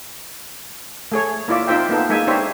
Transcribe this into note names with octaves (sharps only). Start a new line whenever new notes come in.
A3 G#4 C#5
A#3 E4 F4 D5 E5
C4 D#4 F4 C5 E5 G5
A#3 B3 D#4 A4
G#3 A#3 D#4 E5 G#5
D4 D#4 G4 C5 C#5 E5